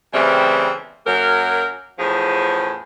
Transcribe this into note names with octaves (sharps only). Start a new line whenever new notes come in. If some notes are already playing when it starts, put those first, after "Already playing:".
C#3 E3 G3 A3 B3 C4
F#2 F#3 A#3 F#4 A#4
E2 A2 F3 C#4 G#4